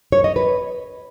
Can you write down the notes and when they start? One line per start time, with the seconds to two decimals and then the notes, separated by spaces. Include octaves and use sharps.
0.12 C#5
0.24 D#5
0.36 B4